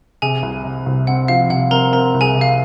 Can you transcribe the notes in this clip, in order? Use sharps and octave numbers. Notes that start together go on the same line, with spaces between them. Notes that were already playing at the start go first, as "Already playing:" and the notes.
C3 G#4 G#5
C2
C3
C2
C4 F#5
F3 F5
C3 F#5
C4 A#4 A#5
C4 A#4 A#5
C2
G#4 G#5
C3
F5